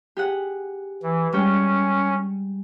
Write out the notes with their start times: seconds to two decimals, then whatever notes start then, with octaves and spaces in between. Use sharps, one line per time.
0.17 G4 G#4 F#5
1.02 E3
1.33 G3 G#3 C#4 G5